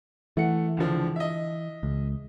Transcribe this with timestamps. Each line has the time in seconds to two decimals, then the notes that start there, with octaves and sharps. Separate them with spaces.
0.37 E3 A3 F#5 C#7
0.77 C#2 D3 F3
1.16 D#5 E5
1.83 C#2